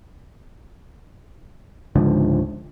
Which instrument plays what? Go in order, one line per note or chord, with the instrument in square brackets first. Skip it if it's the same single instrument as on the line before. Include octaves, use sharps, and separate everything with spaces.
[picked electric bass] C#2 G#2 D3 F3